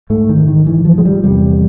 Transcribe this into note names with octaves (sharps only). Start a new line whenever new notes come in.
G#2 A3
D#3
D#3
E3
F3
G#3
G3
E2 C3 G3